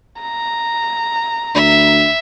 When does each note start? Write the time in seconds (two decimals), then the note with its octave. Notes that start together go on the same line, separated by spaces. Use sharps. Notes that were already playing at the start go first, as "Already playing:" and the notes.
0.21 A#5
1.55 D2 E5